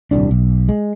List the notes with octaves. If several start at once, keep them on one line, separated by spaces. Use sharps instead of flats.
D#1 C2 G3 D4
B1
G#3